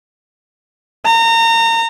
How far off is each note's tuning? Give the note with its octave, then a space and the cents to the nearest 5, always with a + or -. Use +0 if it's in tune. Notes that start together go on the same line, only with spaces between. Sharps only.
A#5 -30